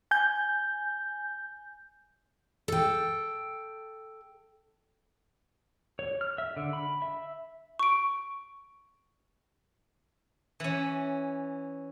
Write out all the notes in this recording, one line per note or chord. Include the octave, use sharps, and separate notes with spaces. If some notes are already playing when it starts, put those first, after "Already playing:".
G#5 G6
A4 G5
C#5
F6
E5
D3
B5
E5
C#6 D7
E3 C#4